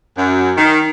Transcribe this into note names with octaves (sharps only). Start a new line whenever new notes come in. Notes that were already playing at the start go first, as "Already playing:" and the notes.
F#2
D#3